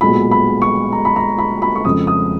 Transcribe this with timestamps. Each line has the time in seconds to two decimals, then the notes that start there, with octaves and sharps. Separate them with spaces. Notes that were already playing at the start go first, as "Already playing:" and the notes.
0.01 B1 A#2 G#3 B3 B5
0.31 B5
0.62 C#6
0.92 A#5
1.05 B5
1.16 A#5
1.38 B5
1.62 B5
1.75 C#6
1.85 F2 C#3 G#3 D#6
2.07 D#6